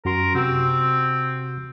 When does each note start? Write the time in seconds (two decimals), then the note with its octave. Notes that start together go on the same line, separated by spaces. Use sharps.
0.05 F#2 F#4 A#4 C6
0.35 C3 C4 F#4 E6